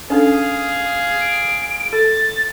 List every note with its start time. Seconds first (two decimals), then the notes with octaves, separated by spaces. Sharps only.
0.10 C#4 D4 G#4 A4 F5
1.21 D7
1.93 A4 A6